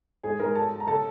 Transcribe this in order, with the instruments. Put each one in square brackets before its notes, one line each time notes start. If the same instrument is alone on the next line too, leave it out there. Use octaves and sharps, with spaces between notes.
[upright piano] G#2 G#4 G#5
G#2 A#4 A#5
F#3 A4 A5
F#3
A#5
C#3 A4 A5